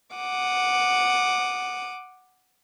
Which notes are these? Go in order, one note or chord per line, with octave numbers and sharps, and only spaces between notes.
F#5 D6 D#6